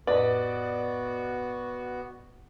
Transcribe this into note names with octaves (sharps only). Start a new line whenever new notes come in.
F2 A2 B3 F#4 B4 D5 D#5